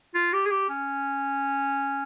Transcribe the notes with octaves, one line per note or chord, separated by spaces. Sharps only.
F4
G4
G#4
G4
C#4